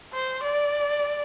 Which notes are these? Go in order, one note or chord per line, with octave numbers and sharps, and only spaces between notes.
C5
D5